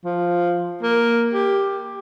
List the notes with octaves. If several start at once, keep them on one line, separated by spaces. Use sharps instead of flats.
F3
A#3
G4